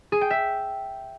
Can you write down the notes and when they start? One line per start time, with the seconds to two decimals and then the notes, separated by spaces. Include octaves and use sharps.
0.12 G#4
0.21 G5
0.31 E5